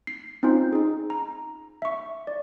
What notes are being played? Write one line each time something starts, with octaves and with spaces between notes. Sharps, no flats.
C7
C4 C#4 D#4 F4 C5
D#4 G#4
A#5
E5 C#6
D5